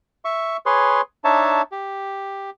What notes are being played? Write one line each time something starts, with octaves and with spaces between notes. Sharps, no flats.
E5 C#6
G#4 B4 C#5 C6
D4 D#4 C#5 E5 A5
G4